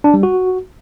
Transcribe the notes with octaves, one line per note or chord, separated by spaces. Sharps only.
D4
G3
F#4